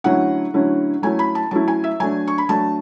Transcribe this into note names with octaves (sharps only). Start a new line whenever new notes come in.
D3 F#3 A3 C#4 E4 F#5
D3 F#3 A3 C#4 E4
F#3 A3 C#4 E4 G#5
B5
A5
F#3 A3 C#4 E4 A5
G#5
E5
F#3 A3 D4 G#5
C#6
B5
F#3 A3 D4 A5